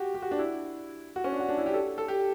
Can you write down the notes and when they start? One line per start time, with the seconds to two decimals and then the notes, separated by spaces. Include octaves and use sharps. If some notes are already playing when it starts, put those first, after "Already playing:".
Already playing: F#4 G4
0.14 G4
0.22 F#4
0.31 D4
0.39 E4
1.16 F#4
1.24 C#4
1.32 D4
1.40 F#4
1.49 D4
1.58 E4
1.66 G4
1.74 A4
1.98 A4
2.08 G4